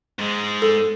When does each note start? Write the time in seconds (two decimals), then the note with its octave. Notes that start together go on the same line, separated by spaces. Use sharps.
0.19 G#2 G#3
0.62 A4